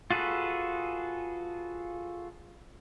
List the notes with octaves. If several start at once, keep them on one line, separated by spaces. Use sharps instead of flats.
F4 F#4 G#4 A4 B4